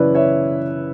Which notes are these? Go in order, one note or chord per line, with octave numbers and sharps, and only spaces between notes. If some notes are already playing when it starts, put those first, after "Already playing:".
Already playing: F#2 C#3 E3 C#4 E4 B4 D5
C#5 E5